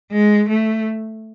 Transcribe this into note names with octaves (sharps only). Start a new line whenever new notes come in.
G#3
A3